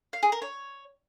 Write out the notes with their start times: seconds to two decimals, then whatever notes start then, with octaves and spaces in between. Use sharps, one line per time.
0.13 F5
0.23 G#4
0.32 A#4
0.42 C#5